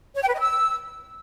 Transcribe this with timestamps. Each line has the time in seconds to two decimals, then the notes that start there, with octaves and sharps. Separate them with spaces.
0.15 C#5
0.21 G5
0.27 B4
0.34 D#5
0.40 E6